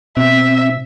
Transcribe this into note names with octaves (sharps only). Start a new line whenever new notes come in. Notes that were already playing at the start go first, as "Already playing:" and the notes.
B2 C4 E5